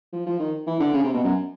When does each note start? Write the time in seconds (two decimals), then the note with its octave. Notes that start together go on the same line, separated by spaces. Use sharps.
0.13 F3
0.26 F3
0.39 D#3
0.67 E3
0.80 D3
0.93 C#3
1.04 C3
1.14 B2
1.24 F#2